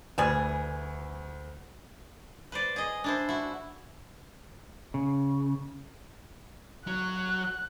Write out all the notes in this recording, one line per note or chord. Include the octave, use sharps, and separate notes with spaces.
D2 E3 G3 G#4
B4 C5 D5
G#4 D#5
D4 E4 C5
E4 F#4
C#3
F#3 F#6